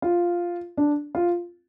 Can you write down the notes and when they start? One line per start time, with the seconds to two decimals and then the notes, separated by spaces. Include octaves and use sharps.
0.02 F4
0.77 D4
1.15 F4